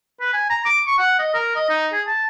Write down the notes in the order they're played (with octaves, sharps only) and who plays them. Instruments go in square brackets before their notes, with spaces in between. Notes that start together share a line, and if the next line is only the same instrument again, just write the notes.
[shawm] B4
G#5
A#5
D6
C#6
F#5
D#5
A#4
D#5
D#4
G#4
A5